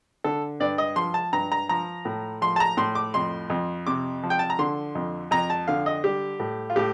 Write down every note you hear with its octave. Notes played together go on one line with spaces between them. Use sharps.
D3 A4
G2 D5
D#5
F3 C6
A5
G2 A#5
A#5
F3 A#5
A2
F3 C6
A5
A#5
A2 C6
D6
F2 C6
F2
C3 D6
F3
G5
A5
A#5
D3 C6
F2
F2 A#5
A5
D3 F5
D#5
G3 G4
A2
F4
A2 G4